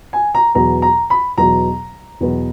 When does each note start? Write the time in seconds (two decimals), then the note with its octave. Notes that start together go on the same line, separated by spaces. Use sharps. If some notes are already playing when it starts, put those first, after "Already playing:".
0.13 G#5
0.35 A#5
0.55 E2 B2 F#3 B3 A#5
0.82 A#5
1.10 B5
1.38 E2 B2 F#3 B3 A#5
2.20 E2 B2 F#3 B3